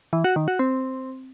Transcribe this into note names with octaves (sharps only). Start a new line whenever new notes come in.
E3
F#4
D#3
F#4
C4